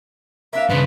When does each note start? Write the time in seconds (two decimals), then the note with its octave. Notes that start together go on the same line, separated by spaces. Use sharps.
0.53 A#3 D4 E5 F5
0.70 G2 C#3 F3 B4 D5